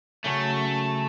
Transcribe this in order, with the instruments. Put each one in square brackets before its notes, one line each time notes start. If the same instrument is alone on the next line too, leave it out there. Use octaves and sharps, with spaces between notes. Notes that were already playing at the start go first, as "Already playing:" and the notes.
[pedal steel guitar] C#3 F#3 C#4 F#4 C#5 [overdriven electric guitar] A3